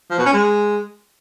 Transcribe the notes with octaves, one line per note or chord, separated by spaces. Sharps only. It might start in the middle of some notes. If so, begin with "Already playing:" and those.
F3
B2
C#4
G#3